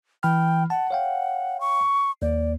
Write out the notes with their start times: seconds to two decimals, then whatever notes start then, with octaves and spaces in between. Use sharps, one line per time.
0.23 E3 G5 B5 F6
0.70 F#5 A5
0.91 C#5 F5 G5
1.61 C#6
2.22 D#2 A#3 D5